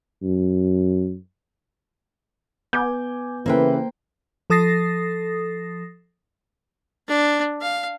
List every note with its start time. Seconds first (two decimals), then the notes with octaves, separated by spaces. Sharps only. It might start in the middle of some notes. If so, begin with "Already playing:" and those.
0.23 F#2
2.73 B3 G#5 D6 G6
3.46 C#3 E3 A#3 E4 A4 B4 C5 G5
4.50 F3 A4 D#6 A6 A#6 C7
7.08 D4
7.61 F5